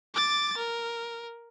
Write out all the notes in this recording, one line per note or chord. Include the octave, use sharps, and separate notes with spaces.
D6 A6
A#4